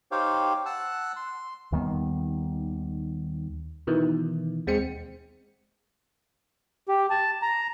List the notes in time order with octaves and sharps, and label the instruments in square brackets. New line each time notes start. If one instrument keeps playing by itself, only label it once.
[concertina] D#4 G4 C5 C#5 F5 G5
F#5 A5 E6 F#6
C6
[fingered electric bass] D#2 D#3 G3 B3
[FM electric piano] B2 D#3 E3
D#2 G#3 C4 C#7
[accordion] G4
A5
A#5